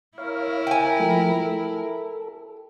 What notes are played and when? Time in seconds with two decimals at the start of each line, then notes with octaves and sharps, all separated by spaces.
0.18 E4 A#4 C#5 F5
0.67 G5 G#5
0.99 F3 A3
1.43 A4